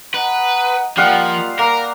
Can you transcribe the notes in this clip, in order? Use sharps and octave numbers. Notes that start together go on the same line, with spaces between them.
B4 D#5 F#5 A#5
F3 G3 A#3 F4 D#5 F5 F#5
A#3 A#4